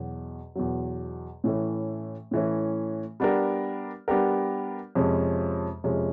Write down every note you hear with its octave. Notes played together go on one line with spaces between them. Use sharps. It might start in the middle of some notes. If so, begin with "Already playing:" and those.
Already playing: E2 B2 F#3
E2 B2 F#3
A2 E3 A3 C#4
A2 E3 A3 C#4
G3 B3 D4 G4 A#4
G3 B3 D4 G4 A#4
F2 C3 F3 G#3 C#4
F2 C3 F3 G#3 C#4